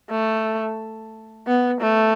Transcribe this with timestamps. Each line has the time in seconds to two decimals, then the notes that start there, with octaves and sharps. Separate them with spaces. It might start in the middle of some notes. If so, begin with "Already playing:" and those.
0.10 A3
1.47 B3
1.81 A3